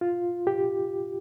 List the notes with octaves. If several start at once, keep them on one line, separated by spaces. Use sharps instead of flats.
F4
G4